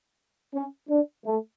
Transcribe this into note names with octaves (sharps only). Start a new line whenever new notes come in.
C#4
D4
A3